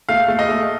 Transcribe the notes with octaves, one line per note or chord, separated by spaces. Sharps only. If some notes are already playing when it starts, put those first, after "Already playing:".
A3 F5
A3
D#5
A3